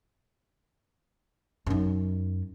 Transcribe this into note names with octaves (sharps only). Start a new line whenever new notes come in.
F#2 D#4